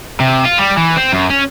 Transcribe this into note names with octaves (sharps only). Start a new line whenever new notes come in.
C3
F4
G3
E3
C4
F#2
C#4